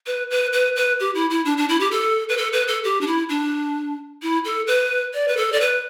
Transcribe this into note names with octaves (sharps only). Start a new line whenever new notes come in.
B4
B4
B4
B4
G4
E4
E4
D4
D4
E4
G4
A4
B4
A4
B4
A4
G4
D4
E4
D4
E4
A4
B4
D5
B4
A4
D5
B4